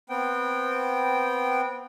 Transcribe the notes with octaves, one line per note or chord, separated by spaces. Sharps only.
B3 C4 G5